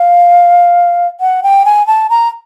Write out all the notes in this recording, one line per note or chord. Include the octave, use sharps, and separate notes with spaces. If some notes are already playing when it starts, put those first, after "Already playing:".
Already playing: F5
F#5
G5
G#5
A5
A#5